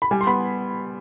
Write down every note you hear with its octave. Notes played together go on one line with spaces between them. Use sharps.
B5
G3 G#5
C6
B3 B5